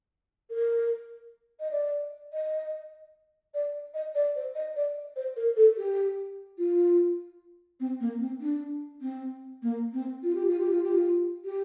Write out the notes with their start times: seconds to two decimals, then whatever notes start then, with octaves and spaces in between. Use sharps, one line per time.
0.50 A#4
1.60 D#5
1.71 D5
2.33 D#5
3.54 D5
3.94 D#5
4.15 D5
4.35 C5
4.55 D#5
4.76 D5
5.16 C5
5.37 A#4
5.56 A4
5.77 G4
6.58 F4
7.80 C4
8.00 A#3
8.20 C4
8.41 D4
9.01 C4
9.62 A#3
9.93 C4
10.23 F4
10.35 G4
10.47 F4
10.60 G4
10.71 F4
10.84 G4
10.95 F4
11.45 G4